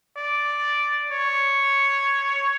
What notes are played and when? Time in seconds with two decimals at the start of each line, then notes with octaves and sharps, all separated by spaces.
0.16 D5
1.11 C#5